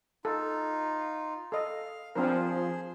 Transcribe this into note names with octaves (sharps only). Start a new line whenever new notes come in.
D#4 F4 A4
A4 D#5 F5
F3 C4 D4 G#4 A#4 C5